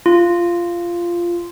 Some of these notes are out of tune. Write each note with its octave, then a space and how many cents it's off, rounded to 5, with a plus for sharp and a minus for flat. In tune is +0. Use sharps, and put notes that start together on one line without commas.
F4 -10